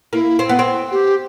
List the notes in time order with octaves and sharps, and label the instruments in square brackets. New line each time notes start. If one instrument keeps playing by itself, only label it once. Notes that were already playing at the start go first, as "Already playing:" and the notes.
[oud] A#3 [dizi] E4
[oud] C4
B3
C4
[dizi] G4